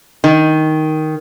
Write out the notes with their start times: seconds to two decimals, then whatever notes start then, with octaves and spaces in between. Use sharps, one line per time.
0.24 D#3